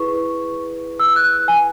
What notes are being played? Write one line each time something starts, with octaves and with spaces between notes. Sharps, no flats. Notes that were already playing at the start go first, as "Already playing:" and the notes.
Already playing: E4 G#4 B4 C#6
E6
F#6
G#5